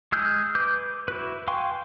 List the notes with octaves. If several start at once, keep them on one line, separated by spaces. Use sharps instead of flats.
G#3 G#4 E6 F6 G6
B4 D6 G6
E4 F#4 B4
F5 G5 G#5 C6 C#6